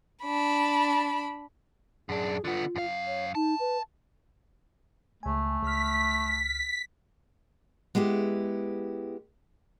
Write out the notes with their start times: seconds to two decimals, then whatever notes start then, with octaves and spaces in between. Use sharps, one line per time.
0.24 D4 B5
2.09 F#2 D4 G#4
2.45 D3 B3 F4
2.76 F#2 F5
3.07 C#5
3.35 D#4 A5
3.60 B4
5.23 C#2 A3 G#5
5.63 C#2 F6 B6
7.95 G#3 B3 E4 G4